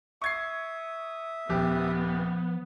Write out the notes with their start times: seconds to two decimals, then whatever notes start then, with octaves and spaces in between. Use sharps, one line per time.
0.22 E5 C#6 D#6 G#6 C7
1.49 D#1 F3 B3 G4